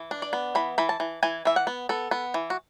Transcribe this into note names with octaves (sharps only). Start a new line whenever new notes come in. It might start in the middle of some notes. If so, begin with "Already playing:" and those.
Already playing: E3
D4
D5
B3
E3 B5
E3 B5
A5
E3
E3 G#5
E3 E5
F#5
B3
B3 A4
B3
E3
F#4